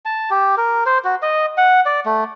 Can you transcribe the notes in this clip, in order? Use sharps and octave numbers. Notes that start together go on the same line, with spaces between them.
A5
G4
A#4
C5
F#4
D#5
F#5
D5
A3